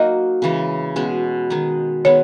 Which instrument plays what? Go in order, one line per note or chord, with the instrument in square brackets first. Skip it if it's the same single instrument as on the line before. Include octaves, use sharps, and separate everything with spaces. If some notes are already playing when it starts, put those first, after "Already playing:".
Already playing: [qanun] F#3 A#3 D#4 F#4 [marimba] D#5
[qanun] C#3 E3 G#3
B2 G#3 C#4
D#3 G#3 D#4 G#4
[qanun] D#3 G#3 B3 [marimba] C#5